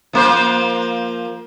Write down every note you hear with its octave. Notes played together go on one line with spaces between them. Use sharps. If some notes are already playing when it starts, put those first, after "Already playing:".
F3 A#3 C5